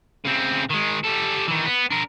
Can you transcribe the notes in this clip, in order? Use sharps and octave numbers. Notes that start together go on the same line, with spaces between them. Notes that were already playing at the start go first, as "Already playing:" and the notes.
C#3 C4
D#3 G#3
G3 A4
D#3 E3
B3
D4 A#4